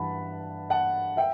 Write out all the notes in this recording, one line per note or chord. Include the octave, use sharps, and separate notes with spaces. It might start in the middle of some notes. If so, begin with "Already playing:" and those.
Already playing: G2 E3 F#5 A5 B5
F#5 A5
E5 G5